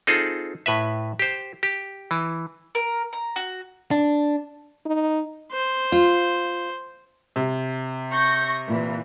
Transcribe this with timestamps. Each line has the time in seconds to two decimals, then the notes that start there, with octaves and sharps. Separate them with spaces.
0.07 C4 D#4 F4 G#4 A4
0.66 A2 B4 E5
1.19 G4 C5
1.63 G4
2.11 E3
2.75 A#4
3.13 A#5
3.36 F#4
3.91 D4
4.85 D#4
5.52 C5
5.92 F4
7.36 C3
8.11 C#6 G6 A#6
8.66 A#2 E3